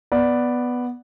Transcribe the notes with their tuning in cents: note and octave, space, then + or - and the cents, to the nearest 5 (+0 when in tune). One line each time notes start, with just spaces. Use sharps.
B3 +0 D5 +0